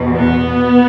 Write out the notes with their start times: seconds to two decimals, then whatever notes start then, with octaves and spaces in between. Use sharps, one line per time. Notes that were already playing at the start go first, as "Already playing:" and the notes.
Already playing: E2 B2
0.17 B3